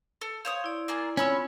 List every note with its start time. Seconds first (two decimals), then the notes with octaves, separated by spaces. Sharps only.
0.21 A4
0.45 C5 C#5 F5 D#6
0.64 E4 D5
0.88 A#3 F4 G#4
1.17 C4 C#4 F4 C#5 B5 E6